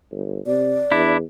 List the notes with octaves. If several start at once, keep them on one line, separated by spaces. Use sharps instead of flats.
G1
C3 D5
E2 D4 E4